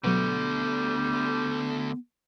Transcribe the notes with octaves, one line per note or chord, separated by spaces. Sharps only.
B2 D3 F#3 G3 A3 B3